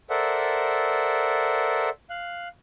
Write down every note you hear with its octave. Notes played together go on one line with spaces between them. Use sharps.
A4 A#4 C5 D5 E5 F#5
F5 F#6